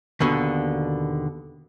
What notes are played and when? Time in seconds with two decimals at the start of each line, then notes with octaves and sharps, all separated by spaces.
0.20 D#2 B2 D3